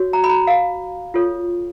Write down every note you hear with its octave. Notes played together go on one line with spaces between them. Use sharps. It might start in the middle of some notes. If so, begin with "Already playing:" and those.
Already playing: F#4 C#5
A#5
B5
A#5
F5
F4 A4 C#5